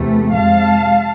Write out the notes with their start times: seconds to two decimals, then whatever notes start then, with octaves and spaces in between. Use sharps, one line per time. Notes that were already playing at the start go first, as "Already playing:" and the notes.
Already playing: E2 C3 E3 A3
0.35 F2 C3 G#3 F5 A5